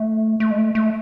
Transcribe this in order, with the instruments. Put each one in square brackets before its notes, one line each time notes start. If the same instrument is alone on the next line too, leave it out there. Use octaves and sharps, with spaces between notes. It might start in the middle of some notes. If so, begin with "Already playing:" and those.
Already playing: [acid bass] A3
A3
G#3
A3
A3